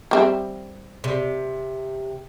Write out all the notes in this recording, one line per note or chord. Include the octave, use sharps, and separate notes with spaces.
G3 C4 E5
C3